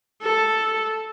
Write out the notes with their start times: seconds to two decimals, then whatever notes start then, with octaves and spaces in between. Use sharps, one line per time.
0.23 A4